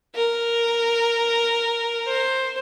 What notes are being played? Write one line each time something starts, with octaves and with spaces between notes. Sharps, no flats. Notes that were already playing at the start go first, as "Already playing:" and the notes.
A#4
C5